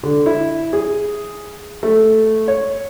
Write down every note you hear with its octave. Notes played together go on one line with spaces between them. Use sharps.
D3
E4
G#4
A3
C#5